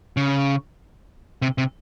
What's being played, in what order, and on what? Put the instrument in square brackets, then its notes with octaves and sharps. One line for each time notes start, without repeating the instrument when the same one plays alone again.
[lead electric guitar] C#3
C3
C3